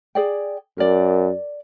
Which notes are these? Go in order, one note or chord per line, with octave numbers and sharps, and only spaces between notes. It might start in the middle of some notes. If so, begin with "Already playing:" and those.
G#4 D5 G5
F#2 A#4 D5